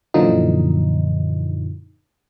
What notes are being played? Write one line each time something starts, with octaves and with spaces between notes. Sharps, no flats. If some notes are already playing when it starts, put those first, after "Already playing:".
F#2 A#2 D3 E3 F3 D#4